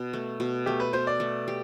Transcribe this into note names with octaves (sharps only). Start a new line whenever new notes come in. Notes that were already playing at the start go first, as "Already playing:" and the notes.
Already playing: B2
A3
B2
A3 G4
B4
B2 C5
D5
A3
G4